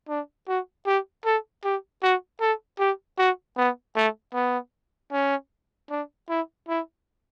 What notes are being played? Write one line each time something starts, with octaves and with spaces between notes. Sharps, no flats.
D4
F#4
G4
A4
G4
F#4
A4
G4
F#4
B3
A3
B3
C#4
D4
E4
E4